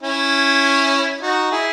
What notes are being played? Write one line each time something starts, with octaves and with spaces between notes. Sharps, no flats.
C#4 E4
D#4 F#4
E4 G#4